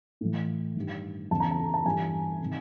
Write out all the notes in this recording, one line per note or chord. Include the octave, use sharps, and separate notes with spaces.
A2 E3
G2 D#3
E2 C#3 E3 A5
A#5
A5
A5
G2 E3 G#5
C3 D#3